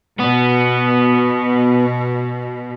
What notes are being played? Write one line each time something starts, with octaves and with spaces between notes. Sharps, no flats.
B2 B3